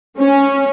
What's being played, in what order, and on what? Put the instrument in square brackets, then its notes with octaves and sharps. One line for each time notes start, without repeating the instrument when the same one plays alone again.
[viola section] C#4